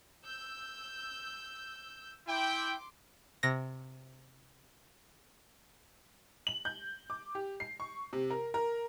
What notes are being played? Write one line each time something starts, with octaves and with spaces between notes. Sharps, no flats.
E6 G6
E4 G5 C6 D6
C3 A#6
F#7
G6
D6
G4
C7
C#6
C3
A#4
A#4